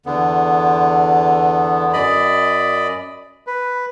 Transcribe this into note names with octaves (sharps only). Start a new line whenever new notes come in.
E2 D3 B3
F#2 D5 D#5 B5
B4